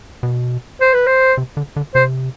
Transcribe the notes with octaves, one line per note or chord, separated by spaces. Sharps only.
B2
C5
B4
C5
C3
D3
D3
C3 C5